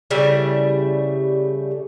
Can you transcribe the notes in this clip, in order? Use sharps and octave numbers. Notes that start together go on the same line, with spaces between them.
C#3 G3 A3 E4